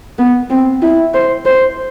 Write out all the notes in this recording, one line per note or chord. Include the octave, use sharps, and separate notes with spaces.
B3
C4
E4
C5
C5